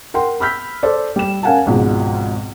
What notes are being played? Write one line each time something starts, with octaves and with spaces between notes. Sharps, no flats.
A#4 F#5 G5 C6
B5 E6 F6 G6 B6
A4 C5 D5
G3 E7
C#4 A#4 F5 F#5 G#5 A5
G#1 C#2 G#2 B2 F3